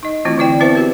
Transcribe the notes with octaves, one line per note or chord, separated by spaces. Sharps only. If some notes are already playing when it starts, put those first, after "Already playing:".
D#4 D#5
E3 A3 C4 E4 F4
D3 E4 D5 G5
B3 C4 E4 B4 C5 E5
F#4 G4 A#4